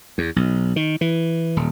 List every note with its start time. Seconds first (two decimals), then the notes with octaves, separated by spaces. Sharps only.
0.18 E2
0.36 B1
0.76 D#3
1.01 E3
1.57 D#1